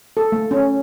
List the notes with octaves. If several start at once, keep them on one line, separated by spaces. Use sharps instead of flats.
A4
A3
C#4